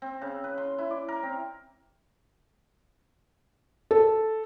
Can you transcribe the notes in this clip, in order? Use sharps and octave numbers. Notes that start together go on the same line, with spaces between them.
C4
C#3
B4
C6
E4
D5
A#4
C4
A4